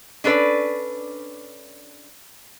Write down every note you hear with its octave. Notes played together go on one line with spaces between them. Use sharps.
C#4 D4 A4 B4 D5